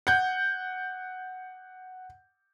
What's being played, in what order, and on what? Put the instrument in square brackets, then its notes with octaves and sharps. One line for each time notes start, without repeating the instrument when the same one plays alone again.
[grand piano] F#5 G6